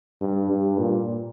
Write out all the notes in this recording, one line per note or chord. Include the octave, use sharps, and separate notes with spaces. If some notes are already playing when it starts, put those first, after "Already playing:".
G2
G2
A#2